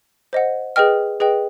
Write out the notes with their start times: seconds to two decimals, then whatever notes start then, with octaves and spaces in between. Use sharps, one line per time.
0.33 C5 D#5 F#5
0.76 G#4 B4 D#5 G5 F6
1.20 G#4 B4 D#5 G5